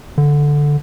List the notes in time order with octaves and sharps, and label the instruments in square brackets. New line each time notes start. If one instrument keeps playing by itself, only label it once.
[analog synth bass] D3